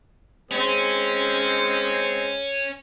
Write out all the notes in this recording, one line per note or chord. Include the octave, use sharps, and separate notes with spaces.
G#3 C4 C#4